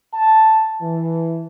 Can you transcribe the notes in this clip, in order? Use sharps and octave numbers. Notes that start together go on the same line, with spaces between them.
A5
E3